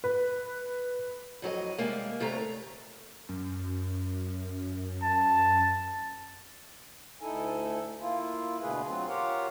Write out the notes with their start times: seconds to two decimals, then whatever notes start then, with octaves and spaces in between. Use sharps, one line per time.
0.04 B4
1.42 F2 F#3 G4 D#5
1.78 C3 G3 G#3 A#3
2.20 D2 C3 A3 C#5 A#5
3.29 F#2
5.02 A5
7.21 D2 D#4 E4 A4 G#5
7.99 A#3 E4 F4
8.61 B2 D3 A3 G#4 B4
8.85 F#3 C4 F4
9.07 F4 G4 A#4 C#5 F5 F#5